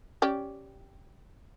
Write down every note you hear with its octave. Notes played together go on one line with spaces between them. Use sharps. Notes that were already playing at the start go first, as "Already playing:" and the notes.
C#4 G4 D5